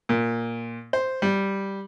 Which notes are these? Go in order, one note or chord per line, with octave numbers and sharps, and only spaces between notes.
A#2
C5
G3